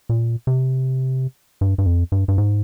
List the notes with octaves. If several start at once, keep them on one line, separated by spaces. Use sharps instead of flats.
A#2
C3
G2
G2
F2
G2
G2
G#2